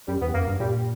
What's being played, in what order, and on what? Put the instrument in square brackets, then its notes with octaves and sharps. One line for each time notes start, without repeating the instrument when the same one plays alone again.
[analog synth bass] F#2 [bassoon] G3
[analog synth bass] E2 [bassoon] B3
[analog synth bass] F#2 [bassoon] A#3
[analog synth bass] G2
[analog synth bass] A#2 [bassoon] G3